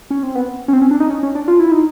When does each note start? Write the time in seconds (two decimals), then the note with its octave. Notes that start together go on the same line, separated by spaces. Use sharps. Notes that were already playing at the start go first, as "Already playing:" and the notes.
0.10 C#4
0.23 C4
0.35 B3
0.68 C#4
0.73 C4
0.82 C#4
0.91 D4
1.00 D#4
1.10 C#4
1.23 C#4
1.35 D4
1.48 F4
1.60 E4
1.72 D#4